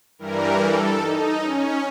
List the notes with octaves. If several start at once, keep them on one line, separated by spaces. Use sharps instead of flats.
G2 E3 G3 A#4
A4
D#4
C#4